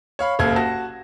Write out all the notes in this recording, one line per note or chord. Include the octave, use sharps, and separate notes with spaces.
C#5 F5 B5
F#1 C2 A4 F5 G#6
F#4 A5 A#6